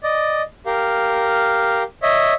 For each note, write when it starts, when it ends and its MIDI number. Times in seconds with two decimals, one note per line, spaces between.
0.03 0.42 74
0.03 0.42 75
0.66 1.83 67
0.66 1.83 70
0.66 1.83 77
2.03 2.34 73
2.03 2.34 75
2.03 2.34 76